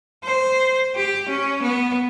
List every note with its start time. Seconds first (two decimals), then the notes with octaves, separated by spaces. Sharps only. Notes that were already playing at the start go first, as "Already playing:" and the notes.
0.24 C5
0.95 G4
1.29 C#4
1.62 B3